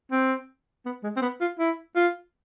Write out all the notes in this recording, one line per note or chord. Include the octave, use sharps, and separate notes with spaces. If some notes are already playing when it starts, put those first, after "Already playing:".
C4
B3
G#3
C4
B3
F4
E4
F4